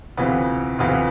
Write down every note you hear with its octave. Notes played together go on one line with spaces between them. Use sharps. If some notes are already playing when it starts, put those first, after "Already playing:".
D2 C3 E3 B3 F4
D2 C3 E3 B3 F4